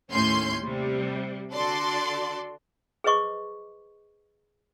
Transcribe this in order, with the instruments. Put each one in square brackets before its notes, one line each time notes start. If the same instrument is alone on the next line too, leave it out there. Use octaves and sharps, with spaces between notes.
[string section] D#2 A2 C#4 C6 G6
C3 G3
D3 F#4 A4 D5 C6
[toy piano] G#4 B4 C5 D#5 C#6 D6